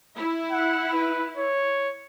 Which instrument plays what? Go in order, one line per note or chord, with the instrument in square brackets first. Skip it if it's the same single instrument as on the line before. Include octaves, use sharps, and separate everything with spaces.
[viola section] E4
[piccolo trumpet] F#5
B4
C#5